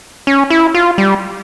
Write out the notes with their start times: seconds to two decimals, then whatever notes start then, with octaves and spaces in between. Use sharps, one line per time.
0.27 C#4
0.50 E4
0.75 F4
0.98 G3